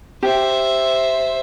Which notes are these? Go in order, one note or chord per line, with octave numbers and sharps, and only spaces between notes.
G4 C5 E5